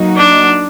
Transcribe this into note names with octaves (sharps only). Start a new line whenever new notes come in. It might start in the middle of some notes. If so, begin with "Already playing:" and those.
Already playing: F#3 A#3 D#4 F#4
D4